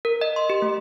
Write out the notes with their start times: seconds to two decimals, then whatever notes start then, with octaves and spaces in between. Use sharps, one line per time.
0.05 A#4
0.21 D#5
0.36 C6
0.50 G4
0.62 A3